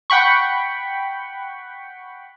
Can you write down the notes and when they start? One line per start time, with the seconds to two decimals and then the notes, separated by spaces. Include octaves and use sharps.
0.10 F#5 G5 B5 C#6